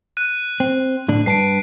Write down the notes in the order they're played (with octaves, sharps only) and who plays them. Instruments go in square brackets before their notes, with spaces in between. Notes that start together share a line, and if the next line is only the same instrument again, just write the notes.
[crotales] F#6 D#7
[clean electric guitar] C4
A2 D3 D4
[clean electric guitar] G2 B4 A5 [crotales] C7 D7